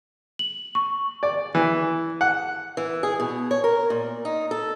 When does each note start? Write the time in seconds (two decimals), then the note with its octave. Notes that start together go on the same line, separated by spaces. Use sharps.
0.39 F#7
0.75 C#6
1.23 D5
1.55 E3
2.21 F#5
2.77 E3
3.03 G#4
3.20 B2
3.51 C#5
3.64 A#4
3.90 A#2
4.25 D#4
4.51 A4